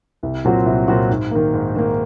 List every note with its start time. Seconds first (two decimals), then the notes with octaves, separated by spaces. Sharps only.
0.23 C2
0.45 A#2 F#3 C4 F#4
0.66 C2
0.88 A#2 F#3 C4 F#4
1.10 G#2
1.31 D#3 A#3
1.54 G#2
1.75 D#3 A#3